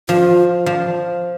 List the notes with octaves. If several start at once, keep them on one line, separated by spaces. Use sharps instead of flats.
F3 F4
F3